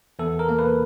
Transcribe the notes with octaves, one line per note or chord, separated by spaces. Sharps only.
E2 A4
A#4
A#3
B4